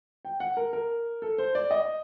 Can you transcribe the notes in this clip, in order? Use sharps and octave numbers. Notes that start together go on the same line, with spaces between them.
G5
F#5
A#4
A#4
A4
C5
D5
D#5